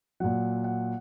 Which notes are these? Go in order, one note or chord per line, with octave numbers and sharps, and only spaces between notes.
A#2 F#3 F#5
F#5